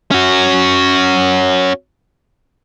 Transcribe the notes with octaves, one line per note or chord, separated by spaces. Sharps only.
C#4 F#4